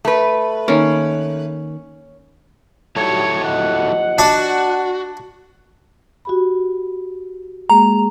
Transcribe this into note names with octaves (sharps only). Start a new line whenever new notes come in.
A3 B4
D#3 A#3 C#4
F#3 G3 D#4 E4 F#4 A4 C#5
D#2 F3 D#5 F#5
D4 F#4
F#4 G4 B5
G#3 A#3 G#4 A#5